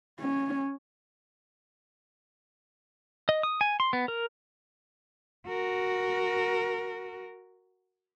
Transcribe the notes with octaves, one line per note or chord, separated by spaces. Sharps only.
C#4
D#5
D#6
G#5
C6
B3
A#4
F#4 A#4